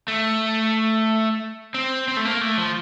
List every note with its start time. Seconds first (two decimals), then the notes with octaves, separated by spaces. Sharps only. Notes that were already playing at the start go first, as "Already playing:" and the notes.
0.08 A3
1.74 C4
2.08 C4
2.17 A3
2.25 A#3
2.41 A3
2.58 F3